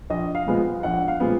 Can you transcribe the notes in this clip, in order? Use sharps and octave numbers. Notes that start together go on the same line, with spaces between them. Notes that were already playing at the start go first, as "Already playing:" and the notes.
A#1 D#5
F5
A#2 F3 G#3 B3
A#1 F#5
F5
A#2 F3 G#3 B3